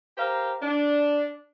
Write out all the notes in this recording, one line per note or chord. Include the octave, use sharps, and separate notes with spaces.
G4 A#4 C5 F5 A#5
D4